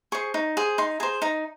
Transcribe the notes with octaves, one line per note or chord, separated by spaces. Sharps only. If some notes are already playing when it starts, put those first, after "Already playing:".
G#4 C5 C#6
D#4
G#4 C5
D#4 C6
G#4 C5 A#5
D#4 A#5